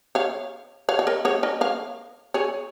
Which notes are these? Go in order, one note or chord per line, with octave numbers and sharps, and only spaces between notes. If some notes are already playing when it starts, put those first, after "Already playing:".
C#5 F5
C#5 F5
C#5
A#4 D#5
G#4 C#5
A#4 D#5
C#5 F5
G#4 C#5